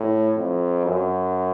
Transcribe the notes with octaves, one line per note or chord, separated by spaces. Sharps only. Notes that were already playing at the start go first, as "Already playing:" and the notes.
Already playing: A2
F2
F#2